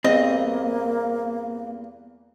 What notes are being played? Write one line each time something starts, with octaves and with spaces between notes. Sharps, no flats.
E2 G2 A#3 C4 D#5